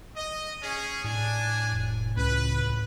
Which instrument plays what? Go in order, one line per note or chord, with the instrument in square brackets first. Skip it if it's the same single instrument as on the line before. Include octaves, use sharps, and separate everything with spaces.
[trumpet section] D#5
C#4 G#4
[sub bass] A2 [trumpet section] D4 G#5
[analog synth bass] F1
[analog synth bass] C#2 [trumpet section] B4